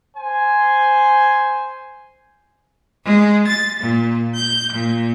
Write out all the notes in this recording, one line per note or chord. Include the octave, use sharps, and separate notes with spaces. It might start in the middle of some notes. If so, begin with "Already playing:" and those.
C5 G#5
G#3
A6
A#2
G6
A#2